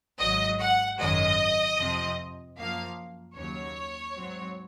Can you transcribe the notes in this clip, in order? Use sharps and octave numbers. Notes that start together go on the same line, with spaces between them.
G#1 G#2 F#3 D#5
F#5
G#1 F#2 D#3 G#3 D#5
F2 C3 F3 C4
F#2 F3 A#3 F5
D#2 C#3 F#3 C#5
G#2 F#3 C4